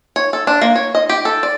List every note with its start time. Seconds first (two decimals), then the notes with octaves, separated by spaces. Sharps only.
0.16 C#5
0.33 A4
0.47 D4
0.62 A#3
0.76 C#5
0.95 D#5
1.09 G4
1.25 A4
1.43 D5